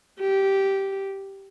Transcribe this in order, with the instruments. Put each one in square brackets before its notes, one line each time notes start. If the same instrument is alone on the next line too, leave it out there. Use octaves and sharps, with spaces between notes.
[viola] G4